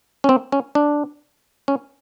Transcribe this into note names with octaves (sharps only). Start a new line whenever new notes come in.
C#4
C4
C#4
D4
C#4